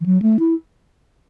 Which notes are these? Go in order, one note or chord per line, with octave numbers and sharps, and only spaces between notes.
E3
F#3
A3
E4